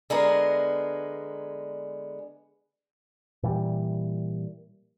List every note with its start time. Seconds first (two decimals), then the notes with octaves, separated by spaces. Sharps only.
0.10 D3 G#3 B3 A#4
3.43 A#2 E3 G3